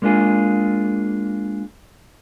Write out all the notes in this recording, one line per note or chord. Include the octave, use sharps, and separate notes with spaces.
G#3 A#3 D4 F4 G#4